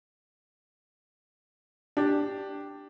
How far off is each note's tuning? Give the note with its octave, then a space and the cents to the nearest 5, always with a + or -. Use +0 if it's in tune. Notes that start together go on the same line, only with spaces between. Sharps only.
D4 +0 G4 +0